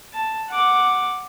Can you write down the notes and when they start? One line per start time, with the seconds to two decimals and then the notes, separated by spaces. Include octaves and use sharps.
0.13 A5
0.50 F#5 D6